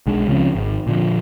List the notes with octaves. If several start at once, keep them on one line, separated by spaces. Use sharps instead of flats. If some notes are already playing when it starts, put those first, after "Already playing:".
B1 G#3 D4
C#2 C#3 F3 C4
G#1
A#2 D3 F3